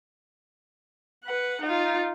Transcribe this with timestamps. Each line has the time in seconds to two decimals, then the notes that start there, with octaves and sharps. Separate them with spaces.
1.25 B4 F#5
1.62 D#4 F4